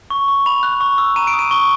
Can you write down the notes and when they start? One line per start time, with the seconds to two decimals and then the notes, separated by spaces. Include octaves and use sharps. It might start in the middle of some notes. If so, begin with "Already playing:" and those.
0.10 C#6
0.28 C#6
0.46 B5 F7
0.63 F#6
0.81 C#6
0.98 E6
1.16 A#5 D#7
1.27 D7
1.33 D#6
1.39 D#7
1.51 C#6 G7